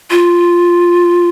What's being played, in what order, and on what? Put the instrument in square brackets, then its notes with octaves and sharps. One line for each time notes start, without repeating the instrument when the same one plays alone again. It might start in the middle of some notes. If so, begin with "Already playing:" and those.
[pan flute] F4